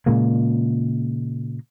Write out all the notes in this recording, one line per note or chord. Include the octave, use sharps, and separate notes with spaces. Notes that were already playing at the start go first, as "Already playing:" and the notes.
A#2 C#3 G#3 A#3